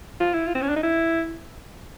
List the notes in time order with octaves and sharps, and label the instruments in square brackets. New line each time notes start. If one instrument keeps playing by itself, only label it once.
[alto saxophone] F4
E4
F4
C4
C#4
D4
D#4
E4